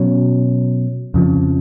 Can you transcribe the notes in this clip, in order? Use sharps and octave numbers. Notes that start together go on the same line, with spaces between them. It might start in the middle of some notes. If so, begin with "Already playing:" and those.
Already playing: B2 F#3 C#4
F2 C#3 F3